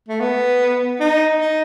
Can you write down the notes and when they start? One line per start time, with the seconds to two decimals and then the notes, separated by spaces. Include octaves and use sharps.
0.09 A3
0.20 B3
1.00 D#4
1.40 D#4